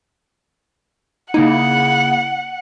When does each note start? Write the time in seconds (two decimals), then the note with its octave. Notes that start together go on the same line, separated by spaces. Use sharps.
1.34 C#3 A#3 D#4 E4 F#5